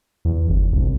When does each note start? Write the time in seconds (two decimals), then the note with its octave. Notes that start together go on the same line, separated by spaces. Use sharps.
0.25 E2
0.49 G1
0.73 C2